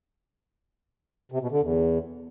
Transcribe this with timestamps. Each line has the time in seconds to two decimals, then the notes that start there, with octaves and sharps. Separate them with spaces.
1.32 C3
1.42 B2
1.51 D3
1.61 E2